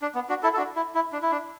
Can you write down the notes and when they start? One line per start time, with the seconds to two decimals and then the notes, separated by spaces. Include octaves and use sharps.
0.02 D4
0.15 B3
0.29 D4 F#4
0.43 E4 A4
0.53 A4
0.57 D4 F#4
0.76 E4
0.95 E4
1.12 D4
1.22 E4
1.32 D4